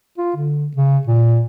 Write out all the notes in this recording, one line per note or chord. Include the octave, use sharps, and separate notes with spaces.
F4
D3
C#3
A#2